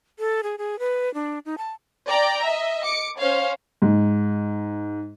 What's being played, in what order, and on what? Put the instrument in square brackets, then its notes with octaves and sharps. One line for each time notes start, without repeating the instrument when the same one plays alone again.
[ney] A4
G#4
G#4
B4
D4
D#4
A5
[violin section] D5 G5 A#5
D#5 E5
D6 C#7
C#4 C5 C#5 F5
[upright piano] G#2